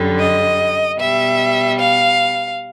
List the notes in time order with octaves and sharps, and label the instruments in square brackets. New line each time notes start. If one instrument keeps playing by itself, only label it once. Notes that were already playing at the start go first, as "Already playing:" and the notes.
Already playing: [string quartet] F#2 D3 G3
D#5
B2 G3 E5
F5